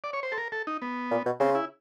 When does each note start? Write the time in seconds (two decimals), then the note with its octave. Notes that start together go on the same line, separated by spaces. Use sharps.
0.04 D5
0.13 C#5
0.23 C5
0.32 A4
0.38 A#4
0.52 A4
0.67 D#4
0.82 B3
1.11 A#2
1.26 B2
1.40 C#3 C4
1.55 E4